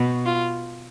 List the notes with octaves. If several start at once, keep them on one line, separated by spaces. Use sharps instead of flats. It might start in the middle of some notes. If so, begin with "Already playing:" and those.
Already playing: B2
F4